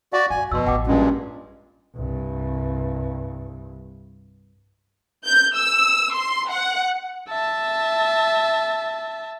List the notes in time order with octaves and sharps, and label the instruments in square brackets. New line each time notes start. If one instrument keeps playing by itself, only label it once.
[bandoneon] F#4 D5 [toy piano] F5
[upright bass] G2 [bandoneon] G#5
[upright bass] F2 [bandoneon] B2 [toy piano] C6 E6
[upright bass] A1 F2 [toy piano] F#5 G5 D6
[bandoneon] G2 A#2 G#3 [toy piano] C#4
[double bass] C2 G2
[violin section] G6
E6
C6
F#5
[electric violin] E5 A5